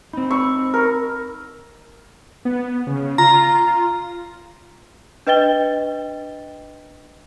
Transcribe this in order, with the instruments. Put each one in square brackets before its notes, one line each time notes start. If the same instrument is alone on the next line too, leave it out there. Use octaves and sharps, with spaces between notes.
[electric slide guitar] C4 D#4 [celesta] B5
[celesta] B5 E6 [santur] C#6
[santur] A#4
[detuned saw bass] B3
C#3
[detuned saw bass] F4 [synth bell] A#5
[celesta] D4 B4 D#5 G5 A6 G7